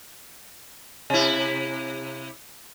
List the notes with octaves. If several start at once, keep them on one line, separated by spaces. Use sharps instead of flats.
C3 E4